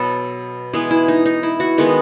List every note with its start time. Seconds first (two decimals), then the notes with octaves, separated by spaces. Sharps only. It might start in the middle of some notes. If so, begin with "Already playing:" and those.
Already playing: B2 F#3 B3 A4
0.73 E3 G#3 B3 G#4
0.91 E4
1.08 D#4
1.26 D#4
1.43 E4
1.60 F#4
1.78 D#3 G#3 B3